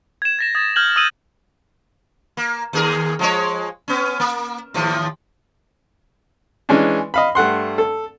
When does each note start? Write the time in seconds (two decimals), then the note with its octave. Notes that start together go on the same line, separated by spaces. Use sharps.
0.22 G#6 E7
0.39 A6 A#6 E7
0.55 D#6 G#6 A6
0.76 F6 G6 G#6 F#7
0.96 D#6 E6 G#6 D#7 F#7
2.37 A#3
2.73 D#2 G#4 A#4
3.19 F3 G#3 C#5
3.88 B3 C#4
4.20 A#3
4.74 D#2 A2 F3
6.69 E3 G#3 C#4 D4
7.14 D#5 F5 B5
7.35 G2 A3 F#5 C6
7.78 A4